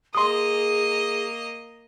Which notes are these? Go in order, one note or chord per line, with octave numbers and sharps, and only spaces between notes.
A#3 G#4 D#5 C6 D#6